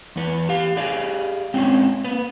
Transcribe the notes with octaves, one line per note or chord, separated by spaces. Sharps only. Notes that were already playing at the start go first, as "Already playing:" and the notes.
E2 B3
G4 F5
G4 G#4 D5 F5
G#3 C4 C#4 F4
A#3 B3